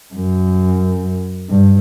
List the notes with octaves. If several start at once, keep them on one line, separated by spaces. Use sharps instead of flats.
F#2
G2